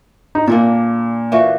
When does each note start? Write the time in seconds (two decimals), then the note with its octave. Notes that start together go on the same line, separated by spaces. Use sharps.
0.35 D#4
0.48 A#2 A#3 D4 A4
1.32 A#2 E3 F#4